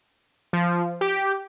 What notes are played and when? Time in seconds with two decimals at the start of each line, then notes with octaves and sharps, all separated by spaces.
0.53 F3
1.01 G4